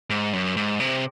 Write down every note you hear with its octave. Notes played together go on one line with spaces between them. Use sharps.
G#2
F#2
G#2
C3